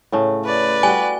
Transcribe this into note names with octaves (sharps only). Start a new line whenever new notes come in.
A2 C#3 A3
B4 D5
G3 F#4 G#5